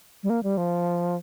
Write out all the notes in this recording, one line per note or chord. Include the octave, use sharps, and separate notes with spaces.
G3
A#3
G3
F3